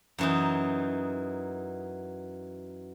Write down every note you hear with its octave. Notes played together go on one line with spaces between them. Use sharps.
F#2 E3 D#4